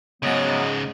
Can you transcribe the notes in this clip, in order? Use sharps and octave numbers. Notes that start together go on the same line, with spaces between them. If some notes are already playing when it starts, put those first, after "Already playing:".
G#2 C#3 F#3 G#3 B3